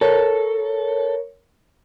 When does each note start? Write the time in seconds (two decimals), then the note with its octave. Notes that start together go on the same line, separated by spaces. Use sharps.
0.01 A4 A#4 C#5